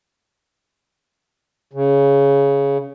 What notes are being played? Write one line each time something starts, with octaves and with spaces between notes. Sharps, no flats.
C#3